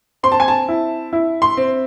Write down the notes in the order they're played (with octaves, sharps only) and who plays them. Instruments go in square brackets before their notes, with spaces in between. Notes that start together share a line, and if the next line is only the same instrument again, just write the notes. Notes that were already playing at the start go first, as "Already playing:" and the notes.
[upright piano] C4 C6
A5
G#5
A5
E4
E4
C6
C4